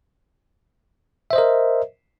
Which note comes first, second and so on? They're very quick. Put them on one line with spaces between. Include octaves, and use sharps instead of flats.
E5 C5 D#5 A#4